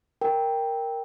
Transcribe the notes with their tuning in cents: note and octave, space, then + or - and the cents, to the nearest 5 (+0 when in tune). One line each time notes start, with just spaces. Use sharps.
A#4 +0 G5 +5